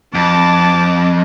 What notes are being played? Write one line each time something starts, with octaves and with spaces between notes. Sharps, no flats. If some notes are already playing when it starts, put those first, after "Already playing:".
F2 A5 D6